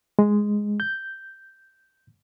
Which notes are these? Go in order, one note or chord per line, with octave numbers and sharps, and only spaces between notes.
G#3
G6